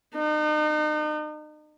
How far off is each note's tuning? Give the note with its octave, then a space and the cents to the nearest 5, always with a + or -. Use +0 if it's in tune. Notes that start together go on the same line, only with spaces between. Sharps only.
D#4 -40